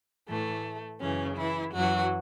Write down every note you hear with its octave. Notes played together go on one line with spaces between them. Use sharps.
A2 E3 A3
F#2 C#3 E3 C#4
E3 E4
F#2 E3 F#3 F#4